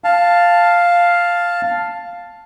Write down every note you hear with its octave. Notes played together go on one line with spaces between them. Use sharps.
F5 A5